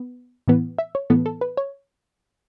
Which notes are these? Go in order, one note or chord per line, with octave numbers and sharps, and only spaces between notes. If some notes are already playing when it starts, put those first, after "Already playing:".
Already playing: B3
A2 E3 B3
E5
C#5
A2 E3 B3 A4
A4
B4
C#5